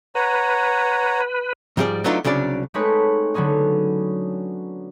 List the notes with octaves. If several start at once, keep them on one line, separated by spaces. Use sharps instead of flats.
B4 C#5 F#5 A#5
G#2 F3 G3 F4 G#4 D5
F#3 A3 B3 D4 D#4 F4
C2 C#3 F#3 D4 D5
G#3 A3 C4 D#4 B4 C#5
D3 F#3 B3 C#4 D#4